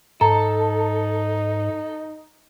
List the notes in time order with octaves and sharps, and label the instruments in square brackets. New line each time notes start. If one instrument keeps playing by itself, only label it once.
[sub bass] G#2 [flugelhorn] D#4 [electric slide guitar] A4 [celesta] A#5